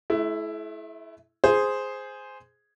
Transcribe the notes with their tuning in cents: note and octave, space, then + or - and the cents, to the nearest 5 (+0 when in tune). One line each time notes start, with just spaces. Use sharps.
A3 -40 E4 +5
G#4 +0 C5 -5